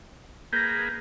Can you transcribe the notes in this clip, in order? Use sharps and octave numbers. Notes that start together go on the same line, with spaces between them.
A#3 G#4 B4 G6 A#6